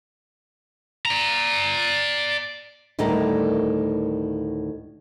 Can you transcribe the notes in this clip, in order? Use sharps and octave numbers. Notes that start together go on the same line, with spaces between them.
D5 A#5
D2 A2 D#3 G3 A#4 D5